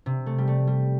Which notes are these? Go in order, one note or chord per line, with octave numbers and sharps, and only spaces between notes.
C3
A3
G3
A3
G3